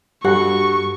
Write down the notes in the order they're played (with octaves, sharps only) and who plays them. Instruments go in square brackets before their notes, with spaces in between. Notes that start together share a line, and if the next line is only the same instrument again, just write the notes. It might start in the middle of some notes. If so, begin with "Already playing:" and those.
[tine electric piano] G2 [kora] F#4 A4 B4 [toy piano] G4 [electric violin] C#6